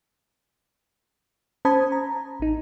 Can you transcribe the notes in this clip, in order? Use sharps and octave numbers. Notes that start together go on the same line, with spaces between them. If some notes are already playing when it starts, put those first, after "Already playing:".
C#4 C5 A5 B5 D#6 G#6
A#5
A1 D#4